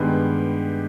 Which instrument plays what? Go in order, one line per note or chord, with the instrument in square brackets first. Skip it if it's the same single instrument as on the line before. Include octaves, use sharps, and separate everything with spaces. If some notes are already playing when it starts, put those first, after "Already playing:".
Already playing: [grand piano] G2 D#3 G#3 B3 G4